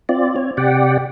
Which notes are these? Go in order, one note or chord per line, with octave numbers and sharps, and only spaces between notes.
C4 F4 D5
C4 C#5
C3 G4 D5 F#5 G5